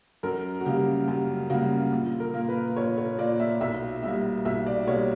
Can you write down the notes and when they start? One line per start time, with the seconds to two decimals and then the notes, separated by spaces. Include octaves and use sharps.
0.23 F#2 A#4
0.61 F#4
0.66 C#3 G3 A#3 G4
1.08 F#2 G4
1.50 C#3 G3 A#3 F#4
1.92 A#1
2.20 A#4
2.34 A#2 A#3
2.48 B4
2.76 A#1 C#5
2.98 C#5
3.18 A#2 A#3 D5
3.40 E5
3.61 B1 E5
4.02 B2 G3 A#3 E5
4.45 B1 E5
4.66 D5
4.87 B2 G3 A#3 C#5